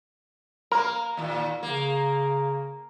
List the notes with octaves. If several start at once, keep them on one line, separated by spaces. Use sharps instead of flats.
A#3 A#4
D#2 A#2
C#3 A#3